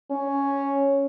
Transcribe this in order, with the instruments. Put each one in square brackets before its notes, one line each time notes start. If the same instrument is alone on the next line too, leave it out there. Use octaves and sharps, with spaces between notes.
[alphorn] C#4